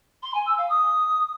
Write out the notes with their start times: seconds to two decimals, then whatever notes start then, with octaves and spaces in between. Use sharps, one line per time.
0.22 C6
0.34 G#5
0.46 E6
0.57 F5
0.69 D#6